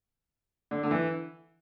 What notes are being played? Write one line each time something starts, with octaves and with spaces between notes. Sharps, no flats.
D3
D3
E3